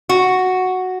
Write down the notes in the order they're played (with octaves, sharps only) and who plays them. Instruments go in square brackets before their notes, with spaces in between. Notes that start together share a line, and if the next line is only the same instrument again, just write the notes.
[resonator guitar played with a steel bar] F#4